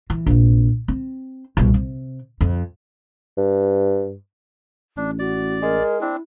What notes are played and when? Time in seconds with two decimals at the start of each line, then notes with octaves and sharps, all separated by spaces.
0.10 E3
0.26 A#1 C3
0.88 C4
1.57 C2 B2
1.74 C3
2.41 F2
3.38 G2
4.97 A1 D4
5.19 F#4 D5
5.63 G#3 A#4
6.01 C4 D4 E4